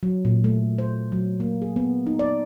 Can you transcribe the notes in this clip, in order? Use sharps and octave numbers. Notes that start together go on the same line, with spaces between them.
F#3
A#2
A3
C5
F#3
A#3
G#4
B3
D#4
D5